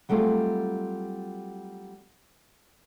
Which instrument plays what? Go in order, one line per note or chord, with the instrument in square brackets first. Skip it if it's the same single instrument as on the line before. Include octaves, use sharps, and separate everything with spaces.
[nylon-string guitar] F#3 G3 A3 C4 F4 G#4